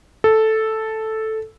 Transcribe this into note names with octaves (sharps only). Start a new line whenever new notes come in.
A4